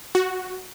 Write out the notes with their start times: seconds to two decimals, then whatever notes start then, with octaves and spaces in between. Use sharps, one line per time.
0.15 F#4